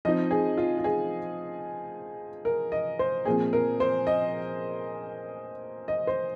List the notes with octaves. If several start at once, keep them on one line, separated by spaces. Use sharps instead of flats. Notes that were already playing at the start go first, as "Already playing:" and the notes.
F3 C4 D#4 D#5
G#4
F4
F4
G#4
A#4
D#5
C5
A#2 F3 C4 G#4
A#4
C5
D#5
D#5
C5